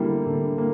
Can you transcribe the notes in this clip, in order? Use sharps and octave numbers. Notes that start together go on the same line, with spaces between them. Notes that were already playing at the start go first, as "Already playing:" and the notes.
Already playing: D3 G3 A#3 E4
D3
A#3